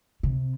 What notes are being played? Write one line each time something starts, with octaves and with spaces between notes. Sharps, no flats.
C3